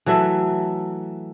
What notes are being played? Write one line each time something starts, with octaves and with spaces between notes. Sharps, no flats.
E3 F#3 A3 E5